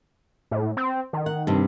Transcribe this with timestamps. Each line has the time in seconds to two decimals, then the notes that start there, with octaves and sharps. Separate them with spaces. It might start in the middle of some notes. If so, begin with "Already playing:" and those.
0.51 A2
0.77 C4
1.13 D#3
1.26 F#5
1.47 G2 C3 D4